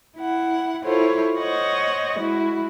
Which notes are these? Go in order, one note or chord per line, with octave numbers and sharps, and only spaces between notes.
E4 F#5
E4 F4 A4 C5 C#5
C5 C#5 D#5 F#5 C#6
G#3 E4 F#4